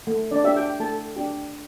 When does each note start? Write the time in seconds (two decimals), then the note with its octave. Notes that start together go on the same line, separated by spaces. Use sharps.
0.07 A3
0.31 D4 D5
0.44 D4 G4 E5
0.56 G4 G5
0.80 A3 A4 A5
1.16 D4 G4